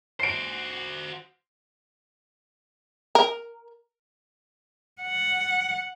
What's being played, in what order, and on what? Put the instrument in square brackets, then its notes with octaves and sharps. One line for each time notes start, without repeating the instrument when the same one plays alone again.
[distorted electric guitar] F#4 C5 [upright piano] C7 D7
[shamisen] A#4
[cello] F#5